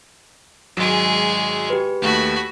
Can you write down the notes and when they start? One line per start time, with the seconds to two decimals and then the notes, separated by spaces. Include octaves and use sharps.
0.77 G#1 F#3 G#3 G#4
1.70 G4 B4
2.02 D#2 A3 F#4 B5